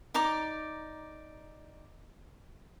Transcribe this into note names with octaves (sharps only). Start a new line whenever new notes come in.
D#4 D5 A#5 D6